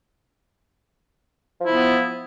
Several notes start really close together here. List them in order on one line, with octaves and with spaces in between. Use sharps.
F3 E4 B3